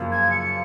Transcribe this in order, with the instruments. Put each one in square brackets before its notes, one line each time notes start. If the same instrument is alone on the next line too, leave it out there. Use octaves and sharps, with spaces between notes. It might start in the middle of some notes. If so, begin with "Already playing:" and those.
Already playing: [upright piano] F#2 C#3 F3 A#3
[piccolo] G#6
C#7